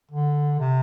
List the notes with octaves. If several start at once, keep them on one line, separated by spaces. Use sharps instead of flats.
D3
C3